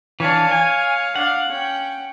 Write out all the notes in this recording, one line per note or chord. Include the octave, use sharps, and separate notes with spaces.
E3 D4 C#5 F5
G#5
D4 F5 F#5
C#4 G5